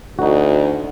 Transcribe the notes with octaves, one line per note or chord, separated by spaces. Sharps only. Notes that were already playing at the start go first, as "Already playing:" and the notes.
D2 D#4 F#4